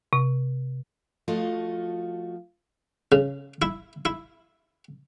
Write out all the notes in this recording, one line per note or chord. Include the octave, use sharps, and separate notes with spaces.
C3
F3 A3 F4 F#4 D#5
C#3
E4
E4